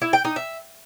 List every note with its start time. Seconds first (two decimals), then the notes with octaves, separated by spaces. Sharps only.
0.01 E4
0.13 G5
0.25 D#4
0.36 E5